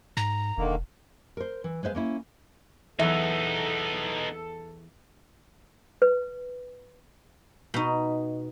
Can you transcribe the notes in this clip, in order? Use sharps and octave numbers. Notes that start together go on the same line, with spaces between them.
G#2 A#5
E1 D3 D#3 A#3
A#4 C5
E3
G#3 B4 C5 E5 F5
A#3 C#4 E4
E2 F#3 B3 D#4 A4 E5
B4
B2 D#4